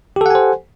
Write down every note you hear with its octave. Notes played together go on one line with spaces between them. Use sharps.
G4 A4 C5 F#5 G#5